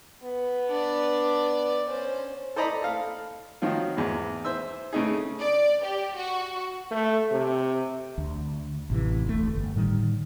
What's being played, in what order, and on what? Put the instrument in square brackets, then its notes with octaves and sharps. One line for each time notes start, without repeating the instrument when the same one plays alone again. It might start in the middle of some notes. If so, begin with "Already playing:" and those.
[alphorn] B3
[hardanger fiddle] D4 D5
[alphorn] C#4 [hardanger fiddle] C5
[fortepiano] A4 C5 D5 D#5 A#5 B5
A4 F5
D#3 F3 F#3 F4
E2 G#2
C5 E5 E6
C#3 A3 D#4 G#4
[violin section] D5
G4
F#4
[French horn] A3
C3
[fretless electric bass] D2
A1 C3 E3
F1 D2 A#2 A3
G1
A2 D3 D#3 G3